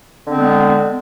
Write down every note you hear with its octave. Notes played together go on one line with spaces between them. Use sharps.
D3 G#3 B3 C4